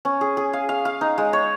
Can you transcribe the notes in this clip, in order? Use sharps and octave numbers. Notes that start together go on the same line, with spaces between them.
C#4
G#4
G#4
F5
F5
F5
D#4
G#3
C#5